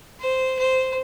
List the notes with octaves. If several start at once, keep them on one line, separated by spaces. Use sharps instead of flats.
C5
C5